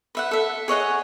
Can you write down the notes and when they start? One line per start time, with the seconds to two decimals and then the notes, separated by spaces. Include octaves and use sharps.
0.15 B4 E5 F#5
0.31 A4 E5
0.68 G#4 C#5 D#5 F#5